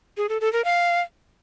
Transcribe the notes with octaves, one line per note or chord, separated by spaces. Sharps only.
G#4
A4
A4
A#4
F5